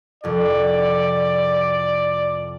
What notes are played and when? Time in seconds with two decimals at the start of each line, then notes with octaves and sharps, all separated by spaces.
0.24 C2 F2 D5